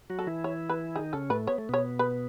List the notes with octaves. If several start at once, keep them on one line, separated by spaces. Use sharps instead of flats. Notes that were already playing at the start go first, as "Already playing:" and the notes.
F#3 F#4
A4
E3 E4
C#5
B4
D#3 D#4 G#4
C#3 C#4 A4
A2 A3 B4
B3 C#5
A3
B2 B3 C#5
B4